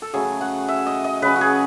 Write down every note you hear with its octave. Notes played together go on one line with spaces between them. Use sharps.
A4
C#3 F#3 A3 G#4
F#5
E5
D#5
D#5
C#3 F#3 C#4 B4
F#4
G#4